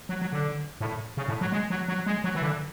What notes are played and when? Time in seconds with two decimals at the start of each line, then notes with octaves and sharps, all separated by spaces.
0.09 F#3
0.21 F#3
0.33 D3
0.81 A2
1.17 C#3
1.28 A2
1.41 F#3
1.52 G#3
1.70 F#3
1.88 F#3
2.06 G#3
2.24 F#3
2.35 E3
2.42 D3